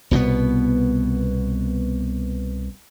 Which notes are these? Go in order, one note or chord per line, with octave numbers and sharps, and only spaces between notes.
C2 B2 G3 B3